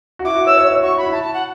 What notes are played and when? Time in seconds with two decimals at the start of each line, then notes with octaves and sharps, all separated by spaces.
0.19 F#4
0.25 E4 D6
0.36 F#4
0.46 C#5 E6
0.57 C#5
0.68 C#5
0.83 F#4 C#6
0.97 F#4 B5
1.06 E4
1.12 F#4 A5
1.23 A5
1.34 F#5